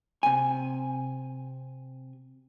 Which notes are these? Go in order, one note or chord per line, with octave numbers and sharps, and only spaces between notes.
C3 G#5